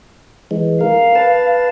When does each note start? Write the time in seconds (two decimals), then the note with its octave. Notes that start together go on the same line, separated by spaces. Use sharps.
0.51 E3 G#3
0.81 A#4 F5
1.15 B4 A5